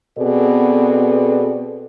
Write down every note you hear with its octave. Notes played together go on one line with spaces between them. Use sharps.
B2 B3 C4 G#4 A4 D5